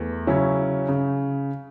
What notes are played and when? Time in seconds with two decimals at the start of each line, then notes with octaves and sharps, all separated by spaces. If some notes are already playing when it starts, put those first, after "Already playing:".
Already playing: E2 A3
0.27 C#3 F#3 C#4 E4
0.88 C#3